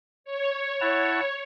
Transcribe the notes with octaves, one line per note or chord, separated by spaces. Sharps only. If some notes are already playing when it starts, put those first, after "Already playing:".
C#5
E4 F#5 A5